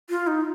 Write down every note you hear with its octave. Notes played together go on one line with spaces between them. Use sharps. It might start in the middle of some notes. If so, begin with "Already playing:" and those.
F4
D#4